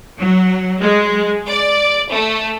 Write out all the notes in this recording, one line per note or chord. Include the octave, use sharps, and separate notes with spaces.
F#3
G#3
D5
A3